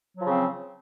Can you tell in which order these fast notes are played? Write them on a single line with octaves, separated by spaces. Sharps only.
F#3 F3 C#3 C4